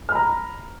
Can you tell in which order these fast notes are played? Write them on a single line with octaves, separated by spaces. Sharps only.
F6 B5 A#5